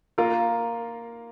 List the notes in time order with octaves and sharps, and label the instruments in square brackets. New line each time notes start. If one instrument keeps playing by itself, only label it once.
[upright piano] A#3 F4 A#4